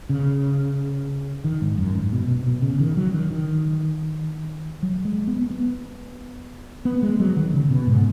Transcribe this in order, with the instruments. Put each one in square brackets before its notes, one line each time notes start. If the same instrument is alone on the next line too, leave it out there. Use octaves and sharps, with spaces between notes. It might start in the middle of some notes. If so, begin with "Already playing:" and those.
[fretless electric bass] C#3
D#3
G#2
F#2
G#2
B2
B2
B2
C#3
D#3
F#3
D#3
D#3
F#3
G#3
B3
B3
B3
G#3
F#3
D#3
C#3
B2
G#2